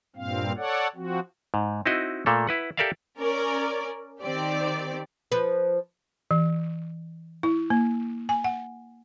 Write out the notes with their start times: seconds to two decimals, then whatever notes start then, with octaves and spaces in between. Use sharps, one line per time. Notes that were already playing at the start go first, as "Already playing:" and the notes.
0.16 G2 A#2 C4 F5
0.57 A4 C#5 D5 F#5
0.95 F3 C4 F#4
1.54 G#2
1.86 C4 D#4 E4 F#4 D#5
2.26 A#2 A3 A#3 A4
2.47 E4 B4 F#5
2.77 G4 A4 A#4 D5 E5 F5
3.19 C#4 A#4 D5
4.22 D#3 C4 G4 D5
5.32 F3 B4
6.31 E3
7.43 E4
7.70 A#3
8.29 G#5
8.44 F#5